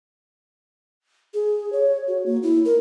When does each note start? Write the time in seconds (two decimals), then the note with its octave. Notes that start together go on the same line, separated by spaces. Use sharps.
1.34 G#4
1.73 C#5
2.07 F#4
2.26 A#3
2.43 E4
2.65 A#4